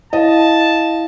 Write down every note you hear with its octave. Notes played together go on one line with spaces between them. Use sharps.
E4 D#5 F5 A5